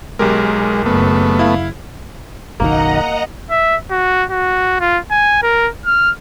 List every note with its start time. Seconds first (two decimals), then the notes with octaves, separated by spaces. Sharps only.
0.19 B1 G#3 G4 A#4
0.86 F#1 A3 B3
1.39 E4 F5
2.60 F#1 B1 D#3 A#3 D#5 F#5 A#5
3.50 E5
3.91 F#4
4.30 F#4
4.80 F4
5.11 G#5
5.43 A#4
5.85 F6